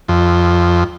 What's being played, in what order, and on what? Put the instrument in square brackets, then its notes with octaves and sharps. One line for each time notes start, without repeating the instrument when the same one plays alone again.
[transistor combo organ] F2